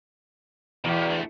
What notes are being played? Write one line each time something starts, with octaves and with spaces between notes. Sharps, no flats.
E2 B2 G4
D2 A3